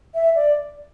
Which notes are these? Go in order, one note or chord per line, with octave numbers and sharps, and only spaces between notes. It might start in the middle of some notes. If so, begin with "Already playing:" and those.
E5
D5